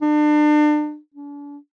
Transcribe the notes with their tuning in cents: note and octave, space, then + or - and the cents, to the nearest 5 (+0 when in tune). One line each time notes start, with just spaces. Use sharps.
D4 +35
D4 -40